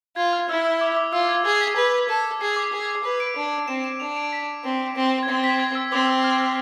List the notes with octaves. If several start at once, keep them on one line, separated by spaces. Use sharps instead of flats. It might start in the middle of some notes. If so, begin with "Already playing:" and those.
F4 G#6
F6
E4 E6
E6
D6
D6
F4 E6
G#6
G#4 G#6
B6
B4
A4
G#4 C7
D6
G#4
B4
D7
D4
C4 E7
E7
D4 F7
D7
B6
C4
C4
G#6
C4 A6
B6
G#6
E6
C4 D6
E6
F6
F6